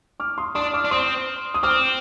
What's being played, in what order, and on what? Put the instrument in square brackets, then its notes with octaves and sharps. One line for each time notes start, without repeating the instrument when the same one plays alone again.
[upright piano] D6 F6
C6 D#6
[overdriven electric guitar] D4 [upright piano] C6 D#6
[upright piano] D6 F6
[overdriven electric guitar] D4
[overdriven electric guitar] C4 [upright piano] C6 D#6
[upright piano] D#6
[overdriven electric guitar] C4 [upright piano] D6 F6